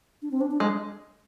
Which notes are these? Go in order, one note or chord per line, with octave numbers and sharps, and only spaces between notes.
D4
C4
D4
D4
G#3